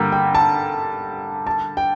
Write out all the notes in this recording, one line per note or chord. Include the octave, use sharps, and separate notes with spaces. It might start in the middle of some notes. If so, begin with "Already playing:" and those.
Already playing: G2 D3 G3 A#3 A#5
G5
A5
A5
G5